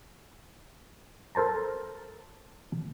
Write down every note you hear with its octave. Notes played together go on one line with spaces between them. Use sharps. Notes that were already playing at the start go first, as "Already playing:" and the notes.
A4 A#4 C5 A5 A#5